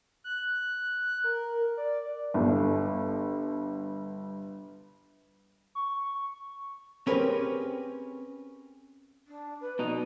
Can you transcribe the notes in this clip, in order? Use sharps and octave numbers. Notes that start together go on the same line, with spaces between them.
F#6
A#4
D5
G1 G2
C#6
C4 C#4 G4 G#4 A#4 B4
D4
B4
B2 D#4 D5